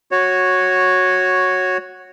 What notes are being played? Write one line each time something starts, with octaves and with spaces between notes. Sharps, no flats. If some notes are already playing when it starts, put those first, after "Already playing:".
F#4 C#5